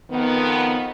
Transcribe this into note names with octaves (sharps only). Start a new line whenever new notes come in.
F2 D#3 B3